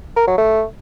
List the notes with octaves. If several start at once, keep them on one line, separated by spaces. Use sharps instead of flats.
A#4
F#3
A3